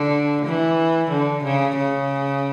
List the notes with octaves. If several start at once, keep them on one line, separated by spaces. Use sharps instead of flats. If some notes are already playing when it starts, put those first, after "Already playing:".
Already playing: D3
E3
D3
C#3
C#3